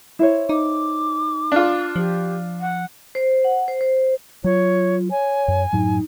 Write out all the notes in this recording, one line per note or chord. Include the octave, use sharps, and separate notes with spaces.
E4 C5 C#5
D#4 D6
D4 F4
F3 G4
F#5
C5
F#5
C5
C5
F#3 F4 C#5
C#5 G#5
F#2
F#2 A2 F#3 D#4